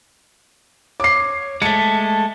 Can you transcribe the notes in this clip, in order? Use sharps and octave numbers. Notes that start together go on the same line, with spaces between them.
C#5 D6 C7
G#3 A3 A5 C#7